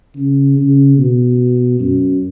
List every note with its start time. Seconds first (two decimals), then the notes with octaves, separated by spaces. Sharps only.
0.16 C#3
0.58 C#3
0.98 B2
1.80 F#2